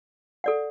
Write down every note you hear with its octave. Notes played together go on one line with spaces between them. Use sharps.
A4 D5 F#5